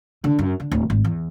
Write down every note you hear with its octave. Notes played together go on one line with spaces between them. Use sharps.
D3
F#2
D3
D1
G#1
E2